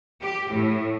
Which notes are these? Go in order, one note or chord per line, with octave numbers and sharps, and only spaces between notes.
G4
A2